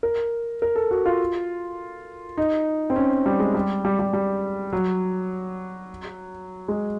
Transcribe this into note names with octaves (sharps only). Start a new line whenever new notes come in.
A#4
A#4
A4
F#4
F4
D#4
C4
C#4
G3
G#3
G3
G3
G3
G3
F#3
G#3